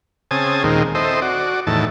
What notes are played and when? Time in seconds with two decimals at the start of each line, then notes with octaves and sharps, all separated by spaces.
0.31 C#3 C4 G#5 A5 D#6
0.64 D#2 A#2 D#3 G#3 C4
0.95 C4 E4 A4 C5 D#5
1.22 F#4 D5
1.67 E2 A2 D#3 A5